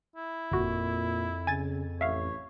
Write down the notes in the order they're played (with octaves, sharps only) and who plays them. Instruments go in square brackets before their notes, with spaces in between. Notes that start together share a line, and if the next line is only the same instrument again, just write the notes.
[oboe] E4
[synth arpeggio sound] G1 F#4 [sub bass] F2 [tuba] A#2
[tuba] C#3 [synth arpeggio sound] G#5 G#6 A6
[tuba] A1 [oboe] C#5 [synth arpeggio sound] E5 F5